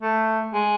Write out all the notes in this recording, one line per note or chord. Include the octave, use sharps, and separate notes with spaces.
A3
G#3